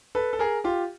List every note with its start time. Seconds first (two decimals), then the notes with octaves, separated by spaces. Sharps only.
0.15 A4 B4
0.33 A4
0.39 G#4 A#4
0.64 F4 G4